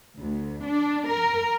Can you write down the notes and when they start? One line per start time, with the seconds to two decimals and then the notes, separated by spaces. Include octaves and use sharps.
0.19 D2
0.67 D4
1.09 A#4